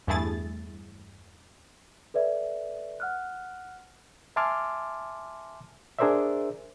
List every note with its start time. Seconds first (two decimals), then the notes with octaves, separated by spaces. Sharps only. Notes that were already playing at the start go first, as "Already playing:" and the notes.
0.07 E2 G2 A3 E4 G#4 A6
2.14 A4 B4 D5 E5
3.00 F#5 F6 F#6
4.36 E5 G#5 A5 C6 D6 F6
5.98 D4 G#4 A#4 C5 D5 E5